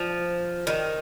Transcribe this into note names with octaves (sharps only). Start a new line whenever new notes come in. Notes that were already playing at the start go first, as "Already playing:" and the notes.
Already playing: F3
D#3